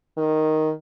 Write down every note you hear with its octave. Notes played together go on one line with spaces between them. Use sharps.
D#3